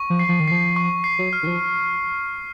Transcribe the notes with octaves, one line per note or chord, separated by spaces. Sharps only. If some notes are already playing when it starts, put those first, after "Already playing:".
Already playing: C#6
F3
C7
F3
D#3
F3 C7
C#6
C7
F#3
F6
D#3
F3